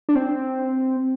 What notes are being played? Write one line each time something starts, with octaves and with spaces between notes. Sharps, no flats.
D4
C4